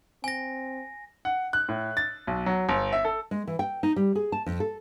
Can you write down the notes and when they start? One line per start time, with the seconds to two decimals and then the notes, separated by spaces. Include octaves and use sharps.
0.24 C4 G#5 A#6
1.25 F#5
1.53 F#6
1.69 A2
1.97 A6
2.27 B1
2.46 F#3
2.69 G1
2.93 E5
3.05 A4
3.31 G#3
3.48 E3
3.59 G5
3.83 D#4
3.96 G3
4.15 G#4
4.32 A5
4.46 F2
4.60 A4